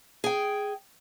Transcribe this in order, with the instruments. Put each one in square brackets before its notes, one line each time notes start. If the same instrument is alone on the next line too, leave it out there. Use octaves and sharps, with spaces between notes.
[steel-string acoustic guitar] G#4 G5